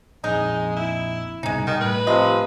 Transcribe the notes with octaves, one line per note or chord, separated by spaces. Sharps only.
A#1 F2 G#3 D#4
E4
C2 G2 B2 G#3 D#4
D#3 G3
A2 B4
C3 F3 D#5